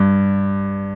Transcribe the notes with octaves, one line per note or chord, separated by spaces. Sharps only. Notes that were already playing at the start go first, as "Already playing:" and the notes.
Already playing: G2